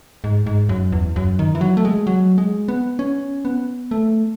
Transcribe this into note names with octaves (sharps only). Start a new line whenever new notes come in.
G#2
G#2
F#2
E2
F#2
D#3
E3
F#3
A3
G#3
F#3
G#3
B3
C#4
B3
A3